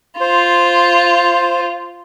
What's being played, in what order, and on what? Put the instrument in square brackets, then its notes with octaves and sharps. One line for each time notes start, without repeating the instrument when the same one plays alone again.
[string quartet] F4 [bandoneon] C5